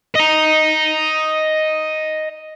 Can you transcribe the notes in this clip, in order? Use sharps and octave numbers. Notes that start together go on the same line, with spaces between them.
D#5 A#5